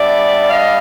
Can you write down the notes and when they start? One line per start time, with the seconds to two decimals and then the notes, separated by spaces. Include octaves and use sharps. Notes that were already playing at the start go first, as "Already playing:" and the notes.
Already playing: G3 B3 D4 D5 E5
0.49 D#5 F5